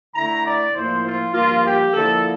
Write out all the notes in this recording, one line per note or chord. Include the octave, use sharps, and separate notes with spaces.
D3 A3 E4 A#5
D5
A2 F3 A#3 E4 C5
F4
G2 F3 A#3 F4
G4
D3 F3 A#3 E4 A4